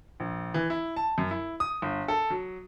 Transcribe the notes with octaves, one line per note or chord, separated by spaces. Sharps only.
A#1
E3
E4
A5
F#2
E4
D#6
G1
A4
F#3